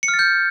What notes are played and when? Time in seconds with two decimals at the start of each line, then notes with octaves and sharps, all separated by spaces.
0.03 C#7
0.08 F6
0.14 A6
0.19 G6